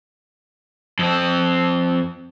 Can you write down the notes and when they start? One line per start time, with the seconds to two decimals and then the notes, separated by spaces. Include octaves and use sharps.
0.99 F2 C4